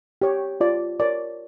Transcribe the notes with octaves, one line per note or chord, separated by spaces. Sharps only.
G4 C#5
F4 D5
A#4 C#5 D5